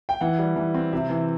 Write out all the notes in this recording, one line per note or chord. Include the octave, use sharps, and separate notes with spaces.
G5
E3 F#5
G3
E3
C4
C3 E5
E3